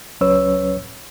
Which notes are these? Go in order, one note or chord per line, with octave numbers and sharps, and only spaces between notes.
C#2 F#3 C#4 B4 C#5 E6